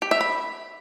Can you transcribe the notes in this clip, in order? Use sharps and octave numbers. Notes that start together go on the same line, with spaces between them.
G4
E5
B5